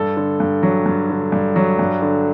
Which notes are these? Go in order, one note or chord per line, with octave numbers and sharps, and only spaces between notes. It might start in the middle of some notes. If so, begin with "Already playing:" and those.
Already playing: G2 A4
D3
G2
F#3
G2
D3
G2
F#3
G2
D3